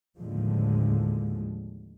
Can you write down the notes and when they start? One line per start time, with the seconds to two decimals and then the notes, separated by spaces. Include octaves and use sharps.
0.19 D#2 A2 D3 F3 G#3